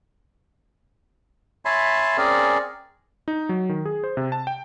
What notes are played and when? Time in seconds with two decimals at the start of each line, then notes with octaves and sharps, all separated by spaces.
1.65 C#5 E5 G#5 A5 B5 C6
2.18 C4 C#4 G#4 A#4 D5
3.28 D#4
3.49 F#3
3.69 D#3
3.85 G#4
4.04 C5
4.17 C3
4.32 A5
4.47 G5